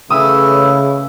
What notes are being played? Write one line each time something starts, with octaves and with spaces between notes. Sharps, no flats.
C#3 E3 A3 E4 D#6 E6